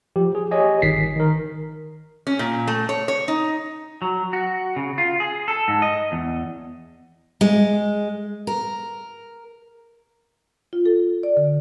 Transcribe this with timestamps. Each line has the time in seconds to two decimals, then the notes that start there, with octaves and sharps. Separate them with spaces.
0.16 F3 G4
0.35 G#4
0.51 G4 C#5 D#5 G#5
0.82 G1 D#3 B6 C7
1.16 D#3 A#4
2.27 C#4
2.39 A#2
2.68 A3
2.89 C#5
3.08 C#5
3.28 D#4
4.02 F#3
4.33 F#4
4.76 C#3
4.98 F4
5.20 G#4
5.48 A4
5.68 G#2
5.82 D#5
6.12 E2
7.41 G#3
8.47 A#4
10.73 F4
10.86 A4
11.23 D5
11.37 D3